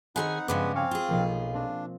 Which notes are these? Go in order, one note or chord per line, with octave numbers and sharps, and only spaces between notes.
D#3 C4 D#4 G#4 F#5 G#5 B5
G2 C#3 F3 G#3 B3 B4 D6
C4 F5 G#5 C#6
F4 G#4
B1 F3 A#3
C4 D4